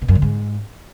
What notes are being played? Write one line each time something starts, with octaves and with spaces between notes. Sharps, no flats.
B2
F#2
D3
G#2